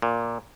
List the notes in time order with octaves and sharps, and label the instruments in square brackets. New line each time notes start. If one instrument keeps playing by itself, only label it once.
[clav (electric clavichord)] A#2